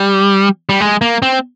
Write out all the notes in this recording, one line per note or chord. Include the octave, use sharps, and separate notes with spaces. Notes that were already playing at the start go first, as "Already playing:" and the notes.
Already playing: G3
G3
G#3
A#3
C4